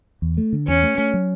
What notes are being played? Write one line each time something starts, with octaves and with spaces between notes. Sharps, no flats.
E2
A3
D3
E2 C#4
A3
A3
F#3